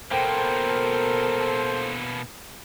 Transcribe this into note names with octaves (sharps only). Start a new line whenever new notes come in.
B2 A#3 A4 A#4 C5 G5